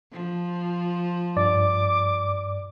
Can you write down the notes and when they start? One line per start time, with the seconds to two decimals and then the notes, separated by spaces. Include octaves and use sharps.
0.12 F3
1.36 G2 D5 D6